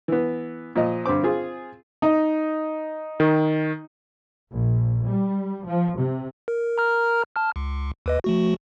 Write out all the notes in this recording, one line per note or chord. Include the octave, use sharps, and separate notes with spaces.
E3 B3
A#2 F3 D#5
G2 D3 C4 D6
C4 F4 G#4
D#4
D#3
A#1
G3
F3
C3
A#4
A#4 A#5 F6
A5 F6
C#2
D#2 B4 D#5
F3 A3 F#4